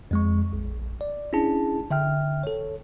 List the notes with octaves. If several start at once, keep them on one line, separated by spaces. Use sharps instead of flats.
F2 G#3 C#6
A#1
D5
C#4 D4 E4 G#4 A5
D3 E5 G5 F6
A4 C#5